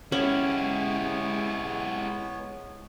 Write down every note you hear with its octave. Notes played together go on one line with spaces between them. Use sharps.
G#3 B3 C#4 E4 G4 C#5 B5